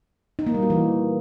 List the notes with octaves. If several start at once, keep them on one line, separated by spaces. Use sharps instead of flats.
D#4
A#3
G3
F#4
E3